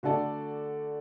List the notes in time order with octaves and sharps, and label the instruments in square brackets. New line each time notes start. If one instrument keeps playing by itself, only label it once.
[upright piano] D3 A3 F#4 A4 D5